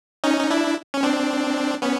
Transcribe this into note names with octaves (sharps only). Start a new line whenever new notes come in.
C#4 D#4
D#4
D4 E4
C#4
C4 D4
B3 C#4